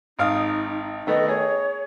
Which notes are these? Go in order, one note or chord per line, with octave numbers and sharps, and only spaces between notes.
G#1 D#4 F5 D#6
D#3 A3 B3 D#5
G#4 C#5